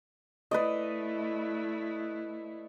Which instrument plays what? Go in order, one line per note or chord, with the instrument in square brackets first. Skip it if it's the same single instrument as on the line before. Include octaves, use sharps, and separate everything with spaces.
[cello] A3 E4 [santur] B4 D5 D#5